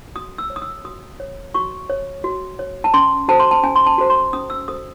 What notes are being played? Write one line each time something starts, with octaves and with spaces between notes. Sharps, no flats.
F#4 D#6
E6
C#5
D#6
E6
F#4 D#6
C#5
F#4 C#6
C#5
F#4
C#5
A5
C#4 C6
F#4 A4 C5 A5
C6
A5
C#4 G#5
C6
A5
F#4 A4 C5
C6
C#4 D#6
E6
F#4 A4 C5 D#6